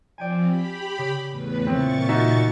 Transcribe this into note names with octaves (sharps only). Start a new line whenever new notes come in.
F3 C4 D5 G5 G#5
G4 B5
C#3
E2 A2 B4
A#2 C#3 E3 C4 C#6 A6
D#4 F#4 E5 G#5